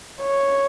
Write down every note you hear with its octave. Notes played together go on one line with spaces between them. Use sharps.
C#5